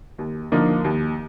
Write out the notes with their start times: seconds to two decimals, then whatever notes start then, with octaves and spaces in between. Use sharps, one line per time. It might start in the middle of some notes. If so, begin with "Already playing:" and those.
0.18 D#2
0.52 D3 F3 A#3 D#4
0.84 D#2